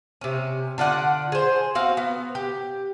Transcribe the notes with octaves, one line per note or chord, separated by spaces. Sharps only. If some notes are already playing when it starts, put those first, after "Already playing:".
C3 C#4
D3 F4 D5 F#5
G#4 C5
C4 F#4 F5
B3
G4